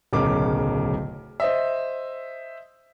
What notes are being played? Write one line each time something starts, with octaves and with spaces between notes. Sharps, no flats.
D1 B1 C#3 A#4 D6
C5 D#5 E5